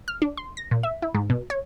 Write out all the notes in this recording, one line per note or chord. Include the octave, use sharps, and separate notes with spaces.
F6
D4
C6
A#6
A#2
E5
E4
G#2
B2
C#5